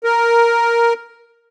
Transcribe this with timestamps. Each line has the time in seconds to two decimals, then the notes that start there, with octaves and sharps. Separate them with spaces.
0.04 A#4